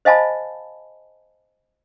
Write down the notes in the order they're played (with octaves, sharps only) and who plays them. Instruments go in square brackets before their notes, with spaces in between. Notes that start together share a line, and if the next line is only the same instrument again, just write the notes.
[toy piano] C5 D#5 F5 G#5 A5 B5